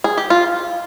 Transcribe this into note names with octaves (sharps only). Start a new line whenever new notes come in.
G#4
G4
F4